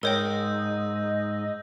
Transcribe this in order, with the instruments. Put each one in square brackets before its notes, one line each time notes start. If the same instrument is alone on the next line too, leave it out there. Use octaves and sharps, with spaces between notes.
[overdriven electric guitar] G#2 [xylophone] A#4 C#5 G5 [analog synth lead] D#5 [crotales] E6 G6 A#6